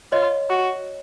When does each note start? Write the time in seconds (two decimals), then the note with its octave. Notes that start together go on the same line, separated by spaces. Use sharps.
0.12 F4 C#5 D#5
0.50 F#4